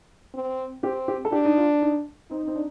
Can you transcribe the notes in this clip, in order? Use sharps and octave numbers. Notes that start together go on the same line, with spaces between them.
C4
C4 G4
G4
A4
D4 G4
D#4
F4
D#4
C4 D#4
C4
D4